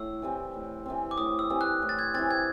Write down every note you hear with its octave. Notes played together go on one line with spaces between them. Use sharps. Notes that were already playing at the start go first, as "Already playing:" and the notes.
Already playing: A2 E6
E3 G3 C4
A2
E3 G3 C4
D6
A2 D#6
E6
E3 G3 C4
F#6
A2
A6
G#6
E3 G3 C4 A6
G#6